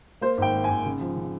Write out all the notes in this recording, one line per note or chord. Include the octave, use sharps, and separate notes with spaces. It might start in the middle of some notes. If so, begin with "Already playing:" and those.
A#3 C5
G#1 G5
A#3
G#1 G#5
C#3
F3
C#3